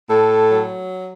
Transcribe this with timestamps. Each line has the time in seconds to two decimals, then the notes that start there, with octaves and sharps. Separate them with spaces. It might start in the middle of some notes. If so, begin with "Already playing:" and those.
0.09 A2 A4
0.51 F#3